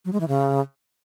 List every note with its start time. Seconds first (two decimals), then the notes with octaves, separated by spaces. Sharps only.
0.05 F#3
0.13 G#3
0.20 E3
0.28 C#3